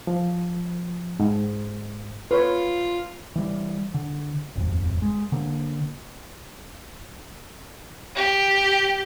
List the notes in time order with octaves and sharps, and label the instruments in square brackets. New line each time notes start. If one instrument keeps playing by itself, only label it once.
[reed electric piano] F3
G#2
[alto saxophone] F4 [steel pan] B4 C#5
[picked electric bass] E3 G3
D3
D#1 G#1 F2
G#3
D3 A#3
[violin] G4